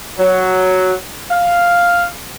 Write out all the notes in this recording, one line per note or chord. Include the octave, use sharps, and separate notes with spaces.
F#3
F5